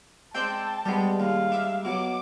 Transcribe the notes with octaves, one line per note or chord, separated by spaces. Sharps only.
G#3 C4 D5 G5 A5 E6 G6
G3 G#3 B3 G4
D#2 F5
D4 E5
B2 F#3 D6